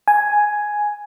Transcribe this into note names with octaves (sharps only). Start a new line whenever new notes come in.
G#5